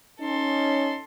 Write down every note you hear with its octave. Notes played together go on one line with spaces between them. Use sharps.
C#4 D#4 A4 C6